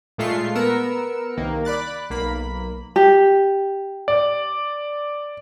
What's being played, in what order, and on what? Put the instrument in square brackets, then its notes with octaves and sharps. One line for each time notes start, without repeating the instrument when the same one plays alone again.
[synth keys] A#2 G#3 A3 F4 C#6 C7
B3 A#4 E6 C#7
C2 D#3 A#3
D5 B5 F#6 A6
B1 A#3 B5
[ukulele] G4
[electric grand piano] D5